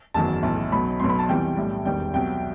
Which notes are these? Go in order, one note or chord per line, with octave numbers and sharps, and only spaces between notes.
F#1 E2 D#3 F#3 A5
B1 A2 E3
B1 B2 F#3 B5
B1 B2 F#3 C6
B5
A5
E2 C3 E3 G3 G5
B1 A2 G3
E1 E2 D#3 G3 G5
C2 B2 F#3 G5